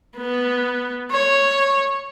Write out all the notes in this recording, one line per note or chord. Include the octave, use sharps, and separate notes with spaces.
B3
C#5